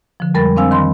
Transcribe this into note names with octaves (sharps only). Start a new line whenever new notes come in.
D3 F3
F2 G3 G#3 A#4 B5 A6
C4 D4 C5 F5 G#5 E6
D#3 B5 C6